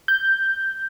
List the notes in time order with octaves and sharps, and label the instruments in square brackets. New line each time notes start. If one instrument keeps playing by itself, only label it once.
[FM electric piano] G6